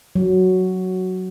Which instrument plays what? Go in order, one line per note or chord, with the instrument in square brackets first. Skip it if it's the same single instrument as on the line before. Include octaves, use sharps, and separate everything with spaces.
[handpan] F#3